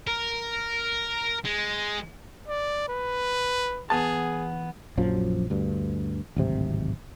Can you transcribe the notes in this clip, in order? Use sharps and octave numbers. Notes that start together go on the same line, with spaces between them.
A#4
G#3
D5
B4
E2 B3 G#4 A5
A#1 F#2 F3 F#3
D2 G2
D1 G#1 C3